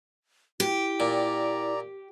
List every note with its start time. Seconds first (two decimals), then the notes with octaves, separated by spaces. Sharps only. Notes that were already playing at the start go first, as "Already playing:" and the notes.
0.60 E4 G4
1.00 A#2 D5 A#5